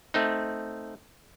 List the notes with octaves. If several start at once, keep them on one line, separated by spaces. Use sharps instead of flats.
A3 C4 D#4